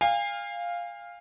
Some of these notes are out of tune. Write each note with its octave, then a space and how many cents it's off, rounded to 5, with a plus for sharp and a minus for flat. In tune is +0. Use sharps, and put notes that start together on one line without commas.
F5 +0 G#5 -40